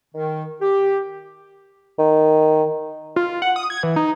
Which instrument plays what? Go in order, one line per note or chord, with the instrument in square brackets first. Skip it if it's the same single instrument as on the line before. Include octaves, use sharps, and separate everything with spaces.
[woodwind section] D#3
G4
[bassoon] D#3
[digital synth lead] F4
F#5
D#6
G#6
E3
D#4